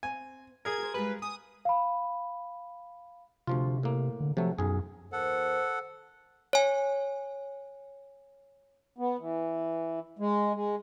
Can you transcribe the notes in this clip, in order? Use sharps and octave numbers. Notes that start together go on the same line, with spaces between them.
C4 G#5
G#4 A#4 G#6
F#4 C5
G3 G#3 F4 B4
G#5 D#6
F5 B5
D2 C3 F3 F4
A2 A#3
D3
C3 F3 F#3 A3
B1 F#2 G#4
D#2 A4 A#4 C5 F#5
C#5 G#5
B3
E3
G#3
G#3